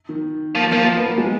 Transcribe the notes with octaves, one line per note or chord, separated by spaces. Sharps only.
D#3
F3 A#3
F3 A#3
A#3
B3
A#3
G#3